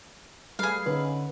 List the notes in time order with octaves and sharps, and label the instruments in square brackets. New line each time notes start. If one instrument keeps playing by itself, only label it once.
[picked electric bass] G3 [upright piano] A3 B4 [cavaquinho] G#4 F5
[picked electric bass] D3 [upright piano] C#4 D#4 [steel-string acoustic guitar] B4